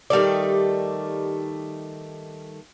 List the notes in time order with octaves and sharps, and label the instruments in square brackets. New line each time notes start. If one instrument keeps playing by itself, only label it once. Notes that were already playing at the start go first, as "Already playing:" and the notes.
[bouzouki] D#3 G3 A3 D5